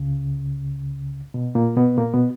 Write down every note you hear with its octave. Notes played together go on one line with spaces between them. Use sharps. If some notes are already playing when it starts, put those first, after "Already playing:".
Already playing: C#2 C#3
B2
A#2 A#3
B2 B3
A#2 A#3
B2 B3